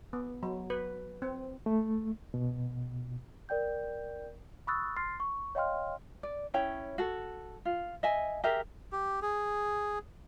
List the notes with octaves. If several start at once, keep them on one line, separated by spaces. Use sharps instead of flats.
B3
F#3
B4
C4
A3
B2
A#4 D5 G5 G6
B5 C#6 D#6 E6 F#6 A6
C6 F6 A6 C7
C#6
C#5 D#5 F5 G5 C6 F6
D5
C#4 E4 C#5 G5
F#4 A4
F4
D#5 E5 G#5
G4 G#4 A#4 E5
G4
G#4